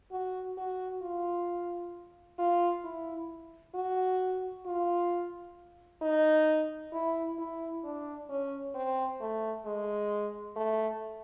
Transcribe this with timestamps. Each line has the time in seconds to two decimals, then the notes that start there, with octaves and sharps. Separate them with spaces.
0.12 F#4
0.57 F#4
1.02 F4
2.39 F4
2.84 E4
3.75 F#4
4.66 F4
6.02 D#4
6.93 E4
7.38 E4
7.84 D4
8.29 C#4
8.75 C4
9.21 A3
9.65 G#3
10.56 A3